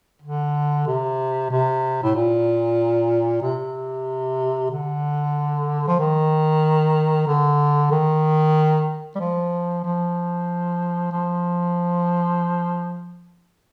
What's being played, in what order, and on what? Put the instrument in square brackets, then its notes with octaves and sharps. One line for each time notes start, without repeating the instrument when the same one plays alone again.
[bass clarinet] D3
C3
C3
A2
A#2
C3
D3
F3
D#3
D3
D#3
G3
F3
F3
F3